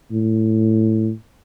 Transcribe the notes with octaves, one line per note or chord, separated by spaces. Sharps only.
A2